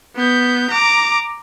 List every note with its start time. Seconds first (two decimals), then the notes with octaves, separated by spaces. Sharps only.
0.16 B3 G6
0.70 A#5 D6